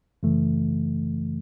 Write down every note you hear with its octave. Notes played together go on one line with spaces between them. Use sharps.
F#2 C#3 E3 A3